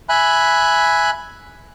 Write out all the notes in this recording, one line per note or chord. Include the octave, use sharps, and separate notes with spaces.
E5 G#5 B5 F#6